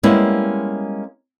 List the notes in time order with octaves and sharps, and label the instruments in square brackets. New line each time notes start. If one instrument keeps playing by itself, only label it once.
[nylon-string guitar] G3 G#3 A#3 B3 C#4 E4